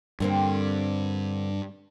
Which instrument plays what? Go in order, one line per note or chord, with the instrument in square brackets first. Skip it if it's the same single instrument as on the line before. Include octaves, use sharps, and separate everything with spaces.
[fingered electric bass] G2 [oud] D3 A#3 C4